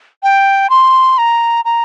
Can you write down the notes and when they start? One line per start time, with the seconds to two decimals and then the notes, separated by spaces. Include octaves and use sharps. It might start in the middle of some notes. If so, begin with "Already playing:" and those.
0.23 G5
0.70 C6
1.18 A#5
1.65 A#5